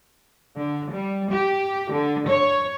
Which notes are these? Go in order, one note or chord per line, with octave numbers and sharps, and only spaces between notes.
D3
G3
G4
D3
C#5